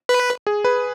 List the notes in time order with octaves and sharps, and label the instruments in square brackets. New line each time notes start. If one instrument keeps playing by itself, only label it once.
[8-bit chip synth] B4
[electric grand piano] G#4
B4